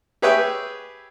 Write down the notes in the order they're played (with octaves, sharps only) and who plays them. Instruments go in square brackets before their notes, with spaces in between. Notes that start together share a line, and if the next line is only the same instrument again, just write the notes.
[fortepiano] G4 G#4 B4 C#5 E5 G5